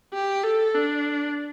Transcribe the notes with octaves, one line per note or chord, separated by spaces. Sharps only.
G4
A4
D4